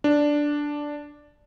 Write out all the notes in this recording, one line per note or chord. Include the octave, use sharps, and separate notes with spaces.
D4